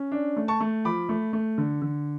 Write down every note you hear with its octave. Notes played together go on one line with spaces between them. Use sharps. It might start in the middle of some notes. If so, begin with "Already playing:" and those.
Already playing: C#4
D4
A3
A5 C#6
A3
F3 B5 D6
A3
A3
D3
D3